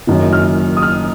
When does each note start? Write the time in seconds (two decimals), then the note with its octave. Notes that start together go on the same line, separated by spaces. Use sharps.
0.07 F#1 F#2 D#3
0.33 F6
0.77 D#6
0.82 F6